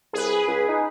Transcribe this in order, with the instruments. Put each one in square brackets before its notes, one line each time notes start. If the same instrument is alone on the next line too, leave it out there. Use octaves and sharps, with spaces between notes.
[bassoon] C2 [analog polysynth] G#4 B4
[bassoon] C#2
D#4